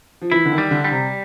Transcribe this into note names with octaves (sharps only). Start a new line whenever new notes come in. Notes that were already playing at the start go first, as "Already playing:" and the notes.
F3
E3 E4
D3
D#3
G3
D3
G3
C3